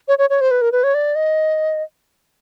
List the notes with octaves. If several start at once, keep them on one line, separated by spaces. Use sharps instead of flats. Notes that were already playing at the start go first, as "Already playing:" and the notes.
C#5
C#5
C#5
C5
B4
A#4
B4
C#5
D5
D#5